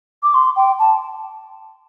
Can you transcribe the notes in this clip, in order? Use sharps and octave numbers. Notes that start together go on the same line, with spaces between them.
D6
C6
G5
A5